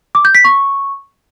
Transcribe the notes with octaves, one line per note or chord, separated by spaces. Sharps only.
D6
G6
B6
C#6